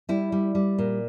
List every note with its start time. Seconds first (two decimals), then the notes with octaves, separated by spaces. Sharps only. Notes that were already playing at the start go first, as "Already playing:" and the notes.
0.09 G3 E4
0.32 G3
0.55 G3
0.78 A#2